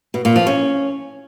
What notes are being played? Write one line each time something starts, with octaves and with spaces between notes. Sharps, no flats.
B2
A#2
F3
C#4